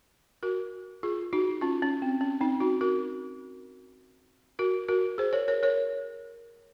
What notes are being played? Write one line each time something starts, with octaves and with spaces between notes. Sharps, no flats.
F#4 A#4
F4 G#4
D#4 F#4
C#4 F4
C#4
C4
C#4
C4 D#4
D#4 F#4
F#4 A#4
F#4 A#4
F#4 A#4
G#4 C5
A#4 C#5
A#4 C#5
A#4 C#5